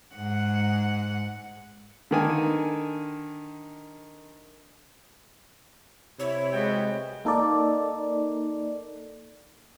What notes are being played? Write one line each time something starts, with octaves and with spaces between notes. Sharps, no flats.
G#2 F#5
D3 D#3 G#5
C3 E4 C#5
G#3 B3 F#4 G5
A#3 D#4 A4 A#4 D5